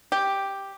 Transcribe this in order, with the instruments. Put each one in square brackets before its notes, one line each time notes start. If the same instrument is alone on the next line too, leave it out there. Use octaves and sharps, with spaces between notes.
[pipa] G4